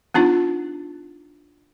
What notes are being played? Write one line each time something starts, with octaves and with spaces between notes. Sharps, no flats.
B3 D4 D#4 F4